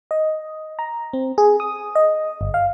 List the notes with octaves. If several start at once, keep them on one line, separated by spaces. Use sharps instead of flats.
D#5
A#5
C4
G#4
D#6
D#5
G1
F5